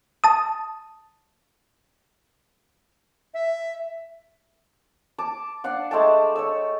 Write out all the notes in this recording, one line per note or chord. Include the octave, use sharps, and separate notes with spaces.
A5 D#6
E5
A5 D6
D4 D5 F5 F#5
G#3 A3 G5 A5
C#5 E6